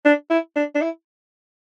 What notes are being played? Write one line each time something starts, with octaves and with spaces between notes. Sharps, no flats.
D4
E4
D4
D4
E4